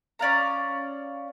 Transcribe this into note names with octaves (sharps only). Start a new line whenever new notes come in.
C#4 D5 F5 A#5